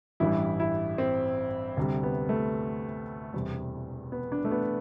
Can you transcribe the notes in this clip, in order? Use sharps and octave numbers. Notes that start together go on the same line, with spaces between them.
A1 G2 E3 G3 E4
E4
C4
D2 C3 G3
B3
A3
E1 E2 C3 G3
B3
D4
A3
B3